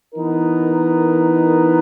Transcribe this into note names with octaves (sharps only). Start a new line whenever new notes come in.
E3 B3 D#4 A#4